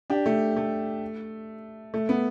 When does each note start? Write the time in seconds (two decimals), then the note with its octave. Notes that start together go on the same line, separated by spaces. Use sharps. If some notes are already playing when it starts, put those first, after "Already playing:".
0.10 D4 G4
0.26 A3 D4
0.57 A3
1.94 A3
2.09 B3